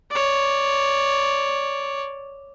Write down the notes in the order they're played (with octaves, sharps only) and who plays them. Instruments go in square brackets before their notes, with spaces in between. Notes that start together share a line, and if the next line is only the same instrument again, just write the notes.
[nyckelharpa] C#5 D5